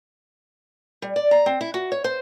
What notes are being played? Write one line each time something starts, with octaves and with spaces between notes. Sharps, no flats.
G3
D5
A#5
C4
E4
F#4
C#5
C5